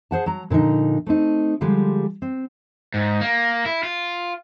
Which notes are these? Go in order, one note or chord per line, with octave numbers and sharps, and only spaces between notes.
G#4 C5 F#5 A5
F#3 A#5
A#2 D3 F3 D#4
A3 C4 D#4
D3 F3 G3 G#3
C4
G#2
A#3
E4
F4